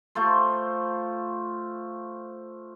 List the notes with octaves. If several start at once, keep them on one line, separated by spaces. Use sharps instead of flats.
A3 F4 C5